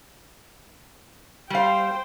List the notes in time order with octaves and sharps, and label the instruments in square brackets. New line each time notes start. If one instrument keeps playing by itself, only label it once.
[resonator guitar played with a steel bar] G3 F5 [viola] C5 G5